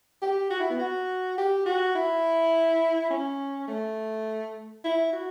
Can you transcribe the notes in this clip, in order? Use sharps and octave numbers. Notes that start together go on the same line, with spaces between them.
G4
F#4
E4
B3
F#4
G4
F#4
E4
C#4
A3
E4
F#4